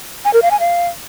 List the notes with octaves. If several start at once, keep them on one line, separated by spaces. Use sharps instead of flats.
G#5
A#4
F5
G#5
F5